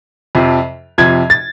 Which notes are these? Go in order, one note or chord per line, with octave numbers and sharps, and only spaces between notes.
F2 C3 F3
F2 C3 F3 G#6
A6